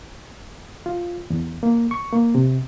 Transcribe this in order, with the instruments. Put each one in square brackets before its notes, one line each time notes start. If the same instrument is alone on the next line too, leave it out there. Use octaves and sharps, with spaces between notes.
[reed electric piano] F4
E2
A#3
C#6
A#3
C3